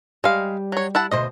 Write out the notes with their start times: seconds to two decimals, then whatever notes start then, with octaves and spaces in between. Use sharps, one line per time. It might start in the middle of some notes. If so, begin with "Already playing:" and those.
0.24 G3 G#3 F5
0.72 F#3 C#5
0.95 E4 F#5 A5
1.11 D2 B2 C5 D#5